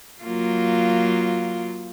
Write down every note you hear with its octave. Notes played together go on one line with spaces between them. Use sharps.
F#3 A#3 F4